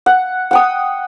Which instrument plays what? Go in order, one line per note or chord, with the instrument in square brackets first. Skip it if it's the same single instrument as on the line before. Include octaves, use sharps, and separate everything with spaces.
[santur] F#5
F#5 G5 D#6